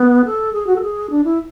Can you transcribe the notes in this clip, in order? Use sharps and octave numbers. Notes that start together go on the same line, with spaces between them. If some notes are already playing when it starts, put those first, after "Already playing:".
Already playing: B3
A4
G#4
F#4
A4
G#4
D4
E4